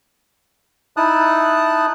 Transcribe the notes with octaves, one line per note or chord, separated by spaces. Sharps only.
D#4 E4 A5 D#6 F#6